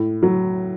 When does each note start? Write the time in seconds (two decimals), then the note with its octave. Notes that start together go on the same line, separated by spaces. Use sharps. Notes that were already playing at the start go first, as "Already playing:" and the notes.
Already playing: A2
0.23 F#3